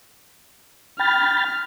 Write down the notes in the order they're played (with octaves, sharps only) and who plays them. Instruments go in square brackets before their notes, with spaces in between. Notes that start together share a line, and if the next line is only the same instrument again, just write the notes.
[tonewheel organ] G5 B5 A6 [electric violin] F6